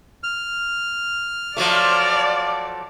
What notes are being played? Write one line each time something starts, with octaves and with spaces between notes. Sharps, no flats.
F6
F3 F#3 A3 D5